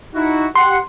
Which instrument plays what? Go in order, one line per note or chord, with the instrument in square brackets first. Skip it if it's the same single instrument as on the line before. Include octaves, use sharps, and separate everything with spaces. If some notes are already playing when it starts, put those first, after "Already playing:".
[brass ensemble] D#4 E4 F#4
[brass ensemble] G4 F#5 [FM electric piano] C6